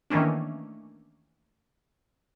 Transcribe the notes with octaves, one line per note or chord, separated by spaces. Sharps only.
D#3 E3 A3 A#3 C#4 D4